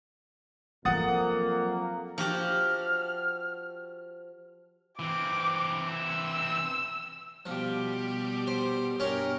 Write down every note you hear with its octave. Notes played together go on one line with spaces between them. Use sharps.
F2 F3 F#3 A#3 F#5 D#6 A6
F3 F#4 G4 F6
E3 C4 D6
E6
B2 F3 G3 G4
C5
G2 B2 C#4 G4 A#4